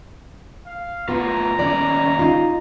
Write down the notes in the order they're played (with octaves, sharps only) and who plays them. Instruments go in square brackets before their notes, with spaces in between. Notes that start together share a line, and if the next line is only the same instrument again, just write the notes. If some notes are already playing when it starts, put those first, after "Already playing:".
[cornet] F5
[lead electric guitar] A2 F4 [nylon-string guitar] B3 [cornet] A#5
[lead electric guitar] D#2 C#4 [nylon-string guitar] D5
[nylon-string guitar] D#4 F4